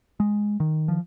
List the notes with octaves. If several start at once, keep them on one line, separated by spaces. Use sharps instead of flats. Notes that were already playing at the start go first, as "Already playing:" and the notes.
G#3
D#3
F3